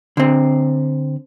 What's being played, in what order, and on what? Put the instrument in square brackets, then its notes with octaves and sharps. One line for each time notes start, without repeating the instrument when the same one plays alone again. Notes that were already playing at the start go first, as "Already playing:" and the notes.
[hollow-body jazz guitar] D3 C4